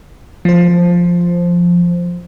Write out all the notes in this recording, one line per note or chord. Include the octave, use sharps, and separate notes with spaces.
F3 C5